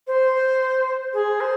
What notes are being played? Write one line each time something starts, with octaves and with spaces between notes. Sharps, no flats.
C5
G#4
C5